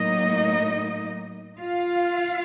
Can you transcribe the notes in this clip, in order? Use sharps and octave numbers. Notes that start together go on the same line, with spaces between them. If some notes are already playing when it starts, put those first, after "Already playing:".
Already playing: A2 F#3 A#3 D#4 D#5
F4 F5